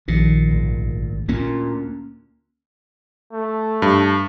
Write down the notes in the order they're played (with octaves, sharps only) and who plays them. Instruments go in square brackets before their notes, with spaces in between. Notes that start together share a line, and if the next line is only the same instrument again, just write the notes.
[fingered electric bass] A#1 D#3 F3 [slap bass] A#2
[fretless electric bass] G#1 D2
[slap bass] D2 A#3 C#4 [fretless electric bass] A#2
[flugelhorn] A3
[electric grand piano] G2